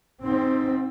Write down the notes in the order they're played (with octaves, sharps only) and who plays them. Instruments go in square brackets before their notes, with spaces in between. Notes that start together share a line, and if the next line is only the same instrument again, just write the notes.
[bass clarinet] G#2 [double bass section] C4